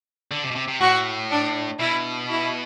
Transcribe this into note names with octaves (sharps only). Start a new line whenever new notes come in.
D3
C3
B2
C3
C3
A2 F#4
D4
B2 E4
E4